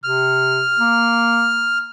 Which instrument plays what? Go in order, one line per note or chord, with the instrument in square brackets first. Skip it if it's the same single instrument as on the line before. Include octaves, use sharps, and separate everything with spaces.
[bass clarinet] C3 [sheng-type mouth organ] F6
[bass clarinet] A#3